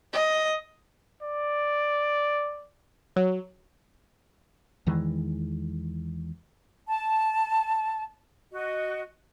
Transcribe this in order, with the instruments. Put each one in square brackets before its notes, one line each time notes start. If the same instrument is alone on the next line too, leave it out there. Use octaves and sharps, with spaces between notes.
[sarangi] D#5
[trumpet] D5
[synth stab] F#3
[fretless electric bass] E2 D#3 E3 G#3
[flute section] A5
F#4 D#5